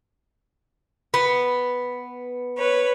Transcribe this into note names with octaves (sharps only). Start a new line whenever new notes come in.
B3
B4 C#5